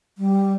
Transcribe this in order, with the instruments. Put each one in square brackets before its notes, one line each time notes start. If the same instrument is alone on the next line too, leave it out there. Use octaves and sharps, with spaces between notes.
[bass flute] G3